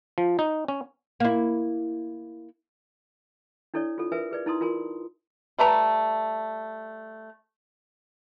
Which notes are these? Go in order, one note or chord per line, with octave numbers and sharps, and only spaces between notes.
F3
D#4
C#4
A#3 E4
D4 E4 A4 C#5 D5
F4 A4
A#4 B4 E5 G#5
G#4 B4 D5
D#4 E4 A5 A#5 C6 D#6
F4 A#4 G#5 C6
G3 A3 B4 A#5